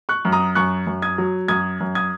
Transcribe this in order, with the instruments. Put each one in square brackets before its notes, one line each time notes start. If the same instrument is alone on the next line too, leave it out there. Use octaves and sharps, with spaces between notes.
[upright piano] C#6 F#6
F#2
A#5 D#6
F#2 C#6 F#6
F#2
D#6 G#6
F#3
F#2 D#6 G#6
F#2
D#6 G#6